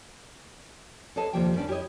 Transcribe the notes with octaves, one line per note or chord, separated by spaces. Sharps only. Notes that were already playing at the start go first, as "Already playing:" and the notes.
A4 B4 C#5 D#5 F5 A5
D#2 C3 F3 G3 A#3 G5
D#2 G3 C#4 D4 B4
E4 G4 C5 C#5 D#5